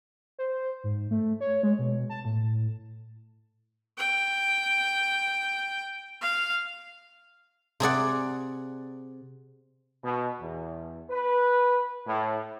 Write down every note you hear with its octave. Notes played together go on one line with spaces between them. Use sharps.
C5
G#2
A3
C#5
G#3
B2
A5
A2
G5
F5
C3 G#4 D5 F#5
B2
E2
B4
A2